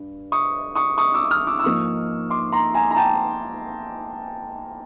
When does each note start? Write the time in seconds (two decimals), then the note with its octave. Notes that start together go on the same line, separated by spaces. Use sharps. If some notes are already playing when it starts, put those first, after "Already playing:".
Already playing: G2
0.32 C#6 D#6
0.75 C#6 D#6
0.98 C#6 D#6
1.14 D6 E6
1.31 D#6 F6
1.47 D6 E6
1.59 E6
1.64 G#2 F3 A#3 D#4 C#6 D#6
2.30 C6 D6
2.52 A#5 C6
2.74 G#5 A#5
2.91 A#5
2.96 G5 A5